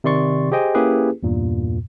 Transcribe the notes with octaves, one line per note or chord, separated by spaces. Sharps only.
C3 D#3 D5 C6 C#6 A6
G4 G#4 C5 D#5 G5 G#5
A#3 C#4 E4 G4 G#4 B4
E2 G2 A#2